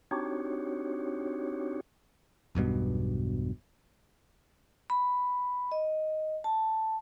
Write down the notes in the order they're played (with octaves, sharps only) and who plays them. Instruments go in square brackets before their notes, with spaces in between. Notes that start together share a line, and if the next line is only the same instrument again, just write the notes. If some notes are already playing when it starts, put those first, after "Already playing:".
[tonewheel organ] C4 D4 D#4 F#4 G4 C#5
[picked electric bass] E1 B1 G2 B2
[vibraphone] B5
D#5
A5